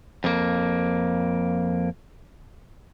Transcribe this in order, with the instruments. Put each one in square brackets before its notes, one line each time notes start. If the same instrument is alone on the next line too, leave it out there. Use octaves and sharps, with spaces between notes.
[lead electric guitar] F2 A#3